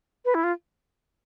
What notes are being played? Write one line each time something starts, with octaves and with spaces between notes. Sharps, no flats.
B4
E4
F4